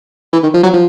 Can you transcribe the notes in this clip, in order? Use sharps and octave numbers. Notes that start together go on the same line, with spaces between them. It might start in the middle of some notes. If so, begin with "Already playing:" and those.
E3
D#3
F3
F#3
F3